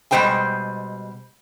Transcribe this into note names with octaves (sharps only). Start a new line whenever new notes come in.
B2 G3 G#3 C5 G5 G#5